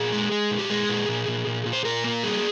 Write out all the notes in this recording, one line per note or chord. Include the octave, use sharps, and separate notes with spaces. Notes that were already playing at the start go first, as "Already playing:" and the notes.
Already playing: A#2 G#4
G#3
G#3
A#2
G4
G#3 G#4
A#2
A#2
A#2
A#2
A#2
C5
A#2 A#4
A#3
G3 G#4